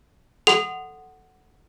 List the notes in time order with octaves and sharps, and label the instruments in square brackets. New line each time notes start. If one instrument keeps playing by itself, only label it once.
[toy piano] A4 F#5 C6 [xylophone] F7